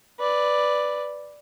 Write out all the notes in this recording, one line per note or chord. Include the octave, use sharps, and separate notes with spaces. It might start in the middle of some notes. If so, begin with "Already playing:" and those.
B4 D5